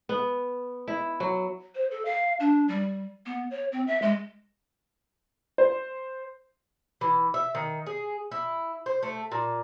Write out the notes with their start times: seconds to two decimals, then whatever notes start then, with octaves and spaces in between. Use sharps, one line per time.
0.09 B3
0.88 E4
1.20 F#3
1.75 C5
1.91 A4
2.05 F5
2.40 D4
2.68 G3
3.26 B3
3.51 C#5
3.72 C4
3.87 E5
4.02 G#3
5.58 C5
7.01 E3
7.34 E5
7.55 D#3
7.86 G#4
8.31 E4
8.86 C5
9.03 A3
9.32 A#2